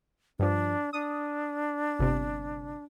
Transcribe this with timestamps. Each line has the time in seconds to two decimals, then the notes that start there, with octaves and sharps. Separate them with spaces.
0.39 G2 F3 D4
0.93 D4 D#6
1.99 G1 C3